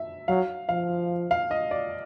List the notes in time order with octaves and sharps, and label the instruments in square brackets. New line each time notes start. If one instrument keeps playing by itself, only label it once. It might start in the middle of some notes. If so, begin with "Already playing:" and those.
Already playing: [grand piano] E5
[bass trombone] F#3 [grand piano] F5
[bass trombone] F3 [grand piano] F5
[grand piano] F5
D#5
D5